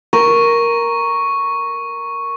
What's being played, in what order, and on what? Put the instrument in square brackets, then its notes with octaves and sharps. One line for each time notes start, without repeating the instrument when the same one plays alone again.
[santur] A#4 [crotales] C#6